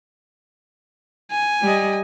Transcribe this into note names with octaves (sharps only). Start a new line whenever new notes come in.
G#5
G3 D#5